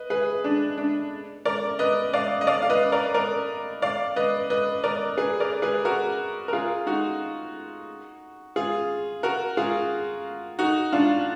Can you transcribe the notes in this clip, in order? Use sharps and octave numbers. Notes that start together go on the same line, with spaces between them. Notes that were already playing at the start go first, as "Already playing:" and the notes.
Already playing: B4 D#5
G#4 B4
D4
D4
A#4 D5
B4 D#5
D5 F5
D#5
D5 F5
F5
B4 D#5
A#4 D5
A#4 D5
D5 F5
B4 D#5
B4 D#5
A#4 D5
G#4 B4
A#4 D5
G#4 B4
F#4 A#4
A#4
F4 G#4
D#4 F#4
F4 G#4
F#4 A#4
F4 G#4
D#4 F#4
D4 F4